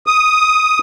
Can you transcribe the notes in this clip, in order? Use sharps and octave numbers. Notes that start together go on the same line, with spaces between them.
D#6